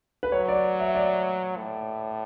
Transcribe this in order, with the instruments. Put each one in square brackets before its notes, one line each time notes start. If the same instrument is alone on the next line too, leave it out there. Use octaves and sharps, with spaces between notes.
[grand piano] B4
[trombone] F#3 [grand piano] C#5
[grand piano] D5
E5
D5
[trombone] A2